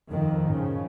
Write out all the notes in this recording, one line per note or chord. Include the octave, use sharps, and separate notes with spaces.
F2 D#3
C#3 F3